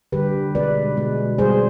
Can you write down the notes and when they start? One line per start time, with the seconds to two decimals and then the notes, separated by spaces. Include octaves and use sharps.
0.12 D3 G3 G4 B4
0.55 B2 G#3 B4 D5
0.97 B2 G#3
1.38 B2 G3 G#4 C5